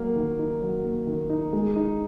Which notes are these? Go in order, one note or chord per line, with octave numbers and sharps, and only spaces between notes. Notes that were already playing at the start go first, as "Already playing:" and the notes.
Already playing: F#3 A#3
D#3
D#4
F#3
A#3
D#3
D#4
G#3
D#4